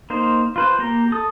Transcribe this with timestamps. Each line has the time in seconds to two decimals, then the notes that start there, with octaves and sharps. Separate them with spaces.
0.10 A#3 D#4 C5
0.56 F4 B4 C5
0.79 A#3 G4 G5 A#5
1.12 A4 D#6